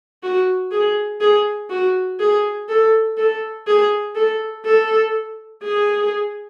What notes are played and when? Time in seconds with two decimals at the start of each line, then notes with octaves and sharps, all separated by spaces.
0.23 F#4
0.72 G#4
1.21 G#4
1.70 F#4
2.20 G#4
2.69 A4
3.17 A4
3.67 G#4
4.15 A4
4.66 A4
5.63 G#4